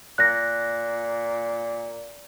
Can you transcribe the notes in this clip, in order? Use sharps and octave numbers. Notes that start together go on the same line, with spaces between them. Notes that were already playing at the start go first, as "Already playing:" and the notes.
A#2 F#6 A#6